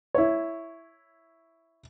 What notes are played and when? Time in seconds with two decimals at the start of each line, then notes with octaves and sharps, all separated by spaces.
0.14 E4 C#5